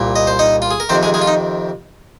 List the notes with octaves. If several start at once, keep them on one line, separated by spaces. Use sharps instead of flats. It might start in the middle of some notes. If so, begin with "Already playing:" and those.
Already playing: C2 A#2
D#5
C5
D#4 D#5
F4
G#4
A#4
F2 C3 D#3 C4 C5
G#3 G#4
G#3 G#4
F4
D#4